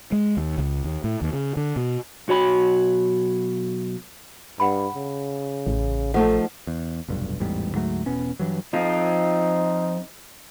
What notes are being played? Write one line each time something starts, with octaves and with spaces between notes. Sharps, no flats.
G#3
D#2
C#2
D#2
A2
D#2
C#3
D3
B2
B1 F#4 C#5 B5
G2 F#5 G5 B5
C#3
A1
F3 A3 D#4 A4 F#5
E2
F1 B1 G2
A1 E2 G#2 G3
D2 G#2 F#3 A3
E1 B2 B3 C#4
G2 E3 F#3
F3 C4 D#4 F4